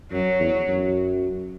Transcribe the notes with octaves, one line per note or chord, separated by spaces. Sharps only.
F#2 F#3
E2
F#2